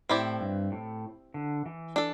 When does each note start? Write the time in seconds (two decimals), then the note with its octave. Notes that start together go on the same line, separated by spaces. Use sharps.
0.09 A2 C4 E4 G4 D5
0.41 G2
0.72 A2
1.34 D3
1.66 E3
1.96 D4 A4